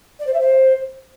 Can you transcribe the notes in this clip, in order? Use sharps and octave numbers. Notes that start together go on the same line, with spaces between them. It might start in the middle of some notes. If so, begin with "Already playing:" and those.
D5
C5
E5
C5